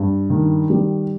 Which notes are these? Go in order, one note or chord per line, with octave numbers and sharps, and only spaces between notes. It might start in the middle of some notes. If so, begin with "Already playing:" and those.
Already playing: G2
D#3
G3